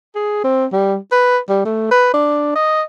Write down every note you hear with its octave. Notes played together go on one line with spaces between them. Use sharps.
G#4
C4
G3
B4
G3
A3
B4
D4
D#5